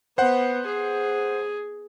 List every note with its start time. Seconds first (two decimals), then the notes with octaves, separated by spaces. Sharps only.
0.18 B3 C5 F#5
0.66 G#4